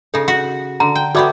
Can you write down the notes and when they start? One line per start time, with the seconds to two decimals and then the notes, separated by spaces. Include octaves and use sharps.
0.14 C#3 D#4 A4
0.28 F#4
0.80 D3 A#5
0.95 G5
1.15 A3 B3 F#4 G4 D5 D6